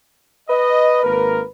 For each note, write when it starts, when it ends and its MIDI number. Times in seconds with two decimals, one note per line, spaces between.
0.50 1.49 71
0.50 1.02 75
1.03 1.43 32
1.03 1.43 58
1.03 1.43 70